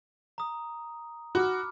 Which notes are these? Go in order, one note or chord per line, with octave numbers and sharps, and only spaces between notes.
A#5 D#6
F#4 B5 D6 F6